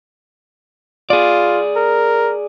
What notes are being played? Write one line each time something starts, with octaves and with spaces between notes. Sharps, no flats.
F4 G#4 D5
A#4